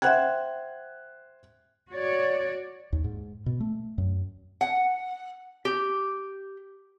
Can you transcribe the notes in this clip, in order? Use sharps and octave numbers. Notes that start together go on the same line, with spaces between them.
C5 E5 F#5 G5 F#6 G#6
F#4 C#5 D5
D#2
G#2
B2
A3
F#2
F#5
G4